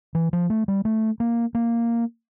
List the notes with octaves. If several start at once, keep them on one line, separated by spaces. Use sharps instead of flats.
E3
F3
A3
G3
A3
A#3
A#3